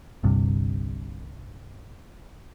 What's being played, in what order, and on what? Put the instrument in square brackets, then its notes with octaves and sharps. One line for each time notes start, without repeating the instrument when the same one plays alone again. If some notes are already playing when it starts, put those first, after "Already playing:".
[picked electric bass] G1 C2 G2 C3